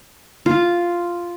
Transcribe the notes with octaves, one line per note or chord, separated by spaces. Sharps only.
F4